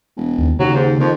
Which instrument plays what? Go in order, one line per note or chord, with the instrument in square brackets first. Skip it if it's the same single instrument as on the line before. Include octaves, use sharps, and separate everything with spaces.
[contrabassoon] E1
[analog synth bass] D#2
[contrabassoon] D#2 [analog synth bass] C#3 [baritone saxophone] F#3
[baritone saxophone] G#2
[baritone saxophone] F2 [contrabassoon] D#3